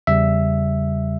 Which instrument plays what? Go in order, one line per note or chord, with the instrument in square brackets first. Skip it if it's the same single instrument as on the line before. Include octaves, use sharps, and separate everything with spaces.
[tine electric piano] E2 C#3 G3 E5